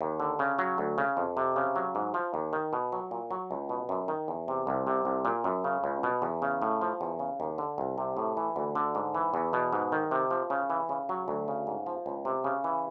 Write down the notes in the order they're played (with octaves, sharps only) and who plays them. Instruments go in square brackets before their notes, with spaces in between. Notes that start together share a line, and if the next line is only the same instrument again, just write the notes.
[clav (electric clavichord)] D#2
D3
C#3
F#3
D2
C#3
F2
C3
C#3
F#3
G#2
F3
D#2
D#3
B2
F#3
A#2
F#3
C#2
B2
F#2
D#3
E2
C3
C2
C3
C2
A#2
F#2
C#3
C#2
B2
E2
C#3
A2
F3
E2
C#3
D#2
D3
C2
C3
A2
E3
D2
D3
G#2
E3
E2
B2
G#2
D#3
C3
F3
C#3
E3
C#3
F#3
D2
C#3
G#2
F3
C#2
C3
C#3
E3